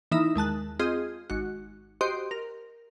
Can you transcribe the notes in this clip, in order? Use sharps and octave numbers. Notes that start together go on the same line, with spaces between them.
E3 A#3 D#4 E4 E5
D#2 G#3 A5 F#6
C4 F4 G#4 D#5
G#1 F#4
F#4 G4 C5 D#5 C6
A#4